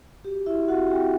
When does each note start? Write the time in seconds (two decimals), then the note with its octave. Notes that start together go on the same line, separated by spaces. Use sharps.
0.25 F#4 G4
0.46 E4 F#4 E5
0.68 C4 F#4 F#5
0.90 C4 G4 G5